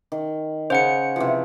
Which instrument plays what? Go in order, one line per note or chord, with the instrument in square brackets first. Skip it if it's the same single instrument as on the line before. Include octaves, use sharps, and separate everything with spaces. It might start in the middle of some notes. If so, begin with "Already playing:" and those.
[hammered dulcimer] D#3
[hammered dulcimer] C#3 [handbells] C5 F#5 C#7
[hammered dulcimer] C3 E3 F3